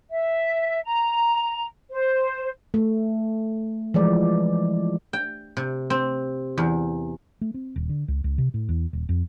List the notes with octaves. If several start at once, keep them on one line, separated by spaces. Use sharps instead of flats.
E5
A#5
C5
A3
E3 F3 G#3 D5
G5
C3
C4
E2
A3
C4
D#1
D3
C#2
C#2
C3
A2
E2
D#1
F2